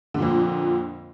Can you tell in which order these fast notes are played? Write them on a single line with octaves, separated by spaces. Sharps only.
D3 A#2 F2